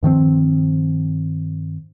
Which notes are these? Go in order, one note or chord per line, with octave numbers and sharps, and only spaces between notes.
G2 D#3 F3 C4